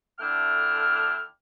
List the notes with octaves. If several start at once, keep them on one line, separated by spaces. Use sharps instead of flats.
D3 A3 D4 E4 G5 F6